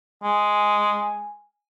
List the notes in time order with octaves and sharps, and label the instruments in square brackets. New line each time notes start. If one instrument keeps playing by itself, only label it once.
[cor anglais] G#3 [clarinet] G#5